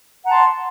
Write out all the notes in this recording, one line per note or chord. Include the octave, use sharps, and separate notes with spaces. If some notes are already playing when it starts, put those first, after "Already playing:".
F#5 A5 A#5 C6